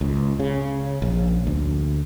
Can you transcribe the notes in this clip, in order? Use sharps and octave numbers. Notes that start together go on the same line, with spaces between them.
C#2
C#3
A#1
D2